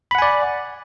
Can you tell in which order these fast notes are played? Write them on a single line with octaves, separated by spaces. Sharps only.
B5 F#5 G#5 D5